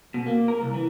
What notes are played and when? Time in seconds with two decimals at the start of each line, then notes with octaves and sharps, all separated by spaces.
0.14 B2
0.26 A#3
0.48 A#4
0.62 C2
0.74 E3